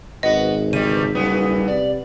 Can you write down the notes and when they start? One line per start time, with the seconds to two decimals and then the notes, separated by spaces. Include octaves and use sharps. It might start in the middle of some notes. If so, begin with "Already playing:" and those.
0.23 G#1 B3 F#4 D#5
0.73 C#3 E3 G3 D#5 D#7
1.15 F#1 G3 B3 D#4
1.68 C3 D5